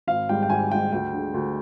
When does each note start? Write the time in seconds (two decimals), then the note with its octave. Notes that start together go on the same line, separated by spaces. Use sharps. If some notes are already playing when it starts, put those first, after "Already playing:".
0.07 G#1 F5
0.29 G#2 G3 G5
0.43 G5
0.50 G#1 G#5
0.71 G#2 G3 G5
0.92 D2 G5
1.13 D3 G#3
1.34 D2